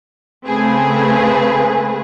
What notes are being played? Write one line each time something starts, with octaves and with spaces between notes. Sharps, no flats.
C#3 A3 C4 G#4 B4